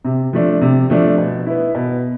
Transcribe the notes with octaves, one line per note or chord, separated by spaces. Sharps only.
C3
F3 A3 D4
C3
F3 A3 D4
B2
B3 E4
B2